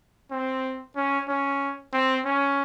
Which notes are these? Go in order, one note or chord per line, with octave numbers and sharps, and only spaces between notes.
C4
C#4
C#4
C4
C#4